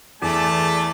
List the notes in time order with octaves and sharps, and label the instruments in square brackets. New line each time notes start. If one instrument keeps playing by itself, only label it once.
[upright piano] E2 [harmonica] A3 D5 A5